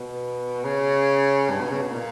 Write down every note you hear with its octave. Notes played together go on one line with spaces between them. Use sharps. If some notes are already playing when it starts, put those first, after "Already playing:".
Already playing: B2
C#3
G2
B2
C#3
B2
A#2